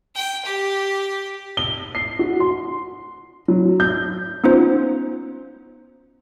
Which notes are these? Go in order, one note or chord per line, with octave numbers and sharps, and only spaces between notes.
G5
G4
G7
C7
F#4
C6
F#3
G6
B3 C#4 D#4 F4 C5